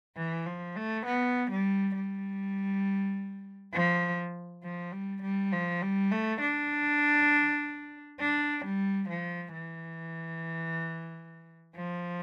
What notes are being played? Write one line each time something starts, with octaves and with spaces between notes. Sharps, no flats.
E3
F3
A3
B3
G3
G3
F3
F3
G3
G3
F3
G3
A3
D4
D4
G3
F3
E3
F3